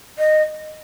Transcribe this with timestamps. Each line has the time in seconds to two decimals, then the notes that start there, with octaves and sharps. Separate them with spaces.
0.19 D#5